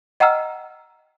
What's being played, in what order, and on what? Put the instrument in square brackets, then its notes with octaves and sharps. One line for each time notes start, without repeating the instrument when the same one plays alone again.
[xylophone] D#5 F#5 G5 A#5 E6 F6